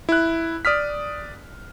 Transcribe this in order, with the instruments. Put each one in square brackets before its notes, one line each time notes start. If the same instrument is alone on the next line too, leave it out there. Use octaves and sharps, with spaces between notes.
[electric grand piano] E4 F#6
D5 D#6 F6 B6